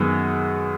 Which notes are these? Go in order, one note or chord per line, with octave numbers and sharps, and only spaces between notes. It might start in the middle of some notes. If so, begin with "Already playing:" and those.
Already playing: F#2 D#3 G#3 B3